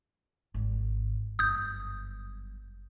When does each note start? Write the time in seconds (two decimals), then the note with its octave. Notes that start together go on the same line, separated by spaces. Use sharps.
0.54 G#1
1.39 G1 F#2 D#6 G6